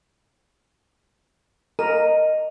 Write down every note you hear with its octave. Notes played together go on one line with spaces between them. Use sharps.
A#4 D#5